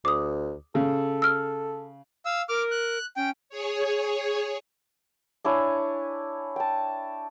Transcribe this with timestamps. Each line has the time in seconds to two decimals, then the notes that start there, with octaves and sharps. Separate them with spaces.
0.05 D2 D6 D#6
0.75 C#3 A4
1.22 E6 F6
2.26 F5 E6
2.49 A#4 D6 F6
2.71 F#6
3.16 C#4 G5
3.49 G#4 C#5
5.44 D4 E4 C#5 G#5
6.56 G5 A5